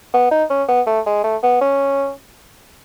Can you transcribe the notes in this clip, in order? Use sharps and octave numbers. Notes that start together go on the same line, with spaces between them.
B3
D#4
C#4
B3
A3
G#3
A3
B3
C#4